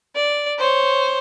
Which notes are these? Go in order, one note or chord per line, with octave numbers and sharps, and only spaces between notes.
D5
C5 C#5